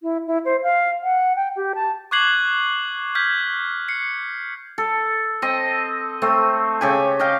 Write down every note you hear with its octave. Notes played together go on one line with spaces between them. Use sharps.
E4
E4
C5
F5
F#5
G5
G4
A5
C#6 D6 F#6 G#6 C7 F#7
F6 G6 G#6 B6
C7 C#7
A4
C4 D#5
A3 C4
C#3 G4 G#5
D#5 F5 G5